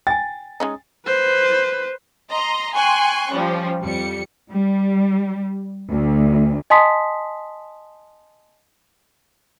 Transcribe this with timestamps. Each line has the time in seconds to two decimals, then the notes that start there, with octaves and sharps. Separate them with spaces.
0.07 G5 G#5 A6
0.60 G#3 C#4 D#4
1.06 B4 C5
2.31 D#5 A#5 C6
2.75 G5 G#5 C6 C#6 F#6
3.30 F3 G3 C#4
3.82 F2 G3 C#7
4.52 G3
5.91 D2
6.70 D#5 G#5 A5 C6 D#6 B6